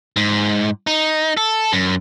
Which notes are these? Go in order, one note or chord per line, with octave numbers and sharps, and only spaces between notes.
G#2
D#4
A4
F#2